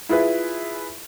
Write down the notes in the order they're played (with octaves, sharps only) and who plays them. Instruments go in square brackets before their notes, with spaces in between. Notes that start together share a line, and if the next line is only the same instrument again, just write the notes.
[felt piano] E4 F4 G#4 B4